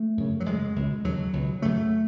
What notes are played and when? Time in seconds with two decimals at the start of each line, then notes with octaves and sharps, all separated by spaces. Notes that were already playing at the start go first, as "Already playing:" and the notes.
Already playing: A3
0.17 F#2 C#3
0.40 F#3
0.46 F#2 C#3 G#3
0.76 C#2 B2
1.04 D#2 C#3 F#3
1.33 C#2 B2
1.62 F#2 C#3 A3